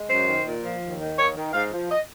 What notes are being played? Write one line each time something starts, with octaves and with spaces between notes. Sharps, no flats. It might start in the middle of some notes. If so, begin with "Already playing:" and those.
Already playing: G#3
F#2 C5
D#3
A#2
F3
D#2
D#3
D#2 C#5
D#3
G#2 F5
F3
D#5